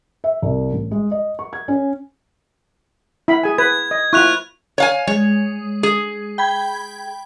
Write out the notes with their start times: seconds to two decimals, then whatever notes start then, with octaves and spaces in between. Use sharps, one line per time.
0.24 E5
0.42 C2
0.72 A1
0.91 G#3
1.11 D#5
1.39 C#6
1.53 G#6
1.68 C#4
3.28 E4 B5
3.43 G#4 G#5
3.58 B4 G#6
3.91 D#5
4.13 E4 F4 C#6 F#6 F7
4.78 C#5 F5 G#5
5.07 G#3 C#5
5.83 G#4
6.38 G5 B5 G#6